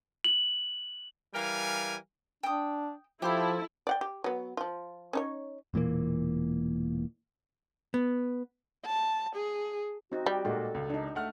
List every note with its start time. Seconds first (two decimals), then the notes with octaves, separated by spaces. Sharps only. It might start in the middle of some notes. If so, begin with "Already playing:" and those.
0.24 F#7
1.34 E3 G3 A#4 F5 G#5
2.43 D4 G5 D#6
3.22 F3 E4 G4 A4 C5 C6
3.87 D5 F#5 G5
4.01 G4
4.24 F#3 B3
4.57 F3 F4
5.13 C#4 D#4 C#5
5.74 E1 A#2 E3 A#3
7.94 B3
8.86 A5
9.36 G#4
10.12 C4 D#4 F#4
10.26 G3 G4
10.45 A#2 G#3 D#4 F#4 A4
10.74 C#2
10.90 D4 D#4
11.15 A3 F#5 F6